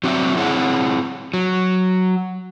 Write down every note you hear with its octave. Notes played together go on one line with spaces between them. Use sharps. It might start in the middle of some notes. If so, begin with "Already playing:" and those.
F#3 C4 F#4 C#5 D5 E5
C4 E4 G#4 C#5 D#5 F#5
F#3